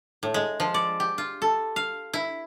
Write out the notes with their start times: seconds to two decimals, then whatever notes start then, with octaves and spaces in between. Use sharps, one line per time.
0.23 A2
0.34 G#3
0.60 F3
0.74 D5
1.00 G4
1.18 F4
1.42 A4
1.76 F5
2.13 E4